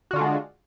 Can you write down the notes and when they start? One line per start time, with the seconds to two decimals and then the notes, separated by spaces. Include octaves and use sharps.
0.11 F#4
0.13 D3
0.16 F4
0.18 D4
0.21 G#3